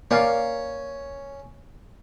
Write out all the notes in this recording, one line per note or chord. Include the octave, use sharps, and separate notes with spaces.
A#3 C#4 D5 F5